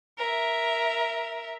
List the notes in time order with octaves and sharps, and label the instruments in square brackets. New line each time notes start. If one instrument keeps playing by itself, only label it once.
[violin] A#4 E5